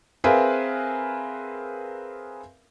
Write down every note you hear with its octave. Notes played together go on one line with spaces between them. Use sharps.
C4 G#4 A#4 B4 E5 F5